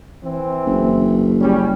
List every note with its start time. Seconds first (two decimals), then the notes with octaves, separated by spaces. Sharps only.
0.23 E3 C4
0.66 F#1
1.41 G3 C#4